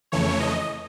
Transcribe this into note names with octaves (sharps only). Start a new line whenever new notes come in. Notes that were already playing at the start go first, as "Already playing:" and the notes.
F2 C#3 E3 A3 C#5
D#5